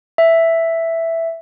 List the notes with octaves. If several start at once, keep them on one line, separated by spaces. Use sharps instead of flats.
E5